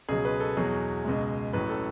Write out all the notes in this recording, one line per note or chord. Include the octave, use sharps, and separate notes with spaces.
C#2 B2 F#3 G#4
B4
A4
E2 B2 F#3 G#4
C#2 B2 G#3
A1 A2 F#3 B4
A4